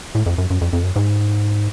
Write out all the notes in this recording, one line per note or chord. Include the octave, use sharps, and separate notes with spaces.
A2
F2
F#2
F#2
F2
F2
F#2
G#2